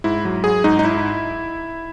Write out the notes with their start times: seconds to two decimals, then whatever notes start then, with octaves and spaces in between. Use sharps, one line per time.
0.04 G#2 E4
0.25 F#3
0.44 F#3 G#4
0.64 G#2 D#4
0.79 D#4
0.84 E4